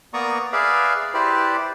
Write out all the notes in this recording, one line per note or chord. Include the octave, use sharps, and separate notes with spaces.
A#3 B3 D5 A#5 C#6 D#6
G#4 B4 D5 E5 F5
E4 G4 B4 C5 D5